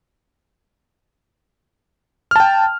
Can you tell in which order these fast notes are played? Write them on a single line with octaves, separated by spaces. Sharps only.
F6 A5 G5